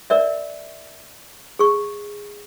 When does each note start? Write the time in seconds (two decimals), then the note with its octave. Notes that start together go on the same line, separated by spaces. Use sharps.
0.10 A#4 D5 E5
1.59 G#4 C#6